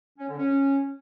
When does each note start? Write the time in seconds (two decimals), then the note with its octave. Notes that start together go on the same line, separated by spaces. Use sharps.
0.18 C#4
0.28 D3
0.39 C#4